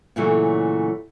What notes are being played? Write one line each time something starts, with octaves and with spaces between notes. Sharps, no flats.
A#2 C#3 E3 F#3 A3 A#3